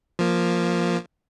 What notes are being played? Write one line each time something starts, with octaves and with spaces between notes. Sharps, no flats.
F3 A#3